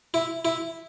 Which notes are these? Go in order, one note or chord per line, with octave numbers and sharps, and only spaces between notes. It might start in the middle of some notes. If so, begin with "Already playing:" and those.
E4
E4